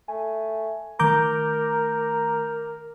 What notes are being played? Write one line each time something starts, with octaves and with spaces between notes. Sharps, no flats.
A3 G#5
D#3 A3 A#4 A#5 D6 G6